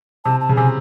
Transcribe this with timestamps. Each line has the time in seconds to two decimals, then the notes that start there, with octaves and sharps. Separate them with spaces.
0.25 C3 A5
0.41 A5
0.49 C#3
0.56 C3 G#5